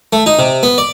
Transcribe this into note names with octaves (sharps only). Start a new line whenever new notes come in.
A3
D#4
C3
B3
D5